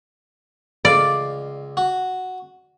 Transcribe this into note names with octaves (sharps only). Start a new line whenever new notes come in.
C#2 D5 F5
F#4